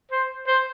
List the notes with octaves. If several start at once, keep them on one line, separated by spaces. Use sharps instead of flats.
C5
C5